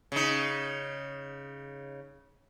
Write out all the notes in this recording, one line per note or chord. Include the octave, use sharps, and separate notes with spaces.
C#3 D#4